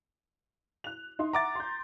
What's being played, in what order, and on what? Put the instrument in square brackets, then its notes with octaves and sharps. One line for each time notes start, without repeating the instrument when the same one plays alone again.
[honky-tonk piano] F#6 F7
D#4 E4 C6
[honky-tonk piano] E5 F#5 [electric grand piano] A#5 D6 A6
[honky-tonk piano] C6 G6